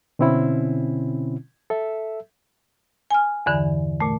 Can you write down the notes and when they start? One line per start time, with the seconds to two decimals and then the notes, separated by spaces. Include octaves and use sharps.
0.19 B2 D3 C4 C#4 E4
1.70 A4 E5
3.11 G#5 F6
3.46 E2 G2 D3 E3
4.00 A#2 A3